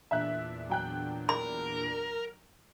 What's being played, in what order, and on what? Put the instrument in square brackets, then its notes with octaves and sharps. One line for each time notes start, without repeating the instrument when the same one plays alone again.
[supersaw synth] E2 A#2 D4 [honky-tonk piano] E5 F#6
[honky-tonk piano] F#3 G5 F#6
[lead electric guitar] A#4 [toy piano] B5